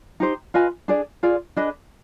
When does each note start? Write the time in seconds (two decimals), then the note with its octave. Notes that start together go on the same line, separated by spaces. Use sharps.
0.20 D#4 G4 C5
0.54 F4 B4 D#5 G#5
0.88 D4 G#4 D5
1.23 F4 G#4 D5
1.57 D4 G#4 B4 D#5